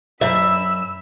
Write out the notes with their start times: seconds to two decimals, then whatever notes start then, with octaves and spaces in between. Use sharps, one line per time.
0.21 F#2 E5 B5 E6